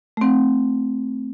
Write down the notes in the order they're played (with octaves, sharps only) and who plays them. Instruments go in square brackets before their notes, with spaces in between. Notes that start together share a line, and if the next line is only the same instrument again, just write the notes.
[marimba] A3 C4